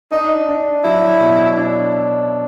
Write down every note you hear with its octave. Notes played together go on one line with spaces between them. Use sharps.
D4 D#4
D4
F#3 E4
B2
D4